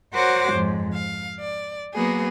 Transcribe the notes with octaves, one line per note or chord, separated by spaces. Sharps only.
F#4 A#4 C5 C#5 F#5 D6
F2 G#2
F5
D5
F#3 A#3 B3 F#4 G#4